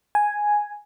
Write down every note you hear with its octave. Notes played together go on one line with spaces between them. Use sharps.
G#5